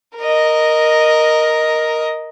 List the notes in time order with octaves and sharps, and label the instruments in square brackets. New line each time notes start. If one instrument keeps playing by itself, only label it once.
[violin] A#4 D#5